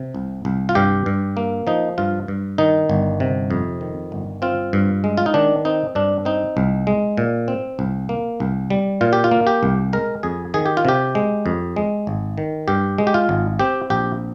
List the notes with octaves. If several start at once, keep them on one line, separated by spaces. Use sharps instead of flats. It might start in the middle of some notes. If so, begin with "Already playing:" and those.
Already playing: C3
C2
C2
F4
G2 G4
G2
A#3
F3 D#4
G2 F4
G2
D#3 D#4
G1
C3
F2
D#3
G1
C4 F4
G2
G#3
F4
D#4
D#3 D4
C4 D#4
G2 D4
C4 D#4
C2
G#3
A#2
C4
C2
A#3
C2
G3
A#2 F4
G4
F4
A#3
G4
C2
G#3 A#4
F2 G#4
D#3 G#4
G4
F4
C3 G4
G#3
F2
G#3
G#1
D#3
G2 G4
G#3
G4
F4
G#1
C4 G4
A#1 G4